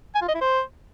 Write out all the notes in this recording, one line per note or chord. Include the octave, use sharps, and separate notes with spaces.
G#5
F4
D#5
E4
C5